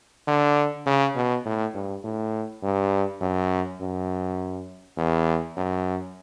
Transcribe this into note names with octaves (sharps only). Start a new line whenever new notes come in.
D3
C#3
B2
A2
G2
A2
G2
F#2
F#2
E2
F#2